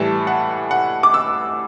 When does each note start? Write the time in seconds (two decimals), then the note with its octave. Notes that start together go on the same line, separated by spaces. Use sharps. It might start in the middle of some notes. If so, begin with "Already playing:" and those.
Already playing: A2 E3 G3 A5
0.27 F#5
0.71 F#5
1.03 D6
1.14 E6